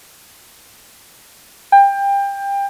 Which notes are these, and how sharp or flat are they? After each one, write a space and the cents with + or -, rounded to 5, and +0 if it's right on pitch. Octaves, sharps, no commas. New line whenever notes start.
G5 +25